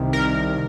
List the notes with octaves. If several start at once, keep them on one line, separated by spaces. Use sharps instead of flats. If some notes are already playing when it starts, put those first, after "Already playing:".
Already playing: C2 C3 D#3
A#4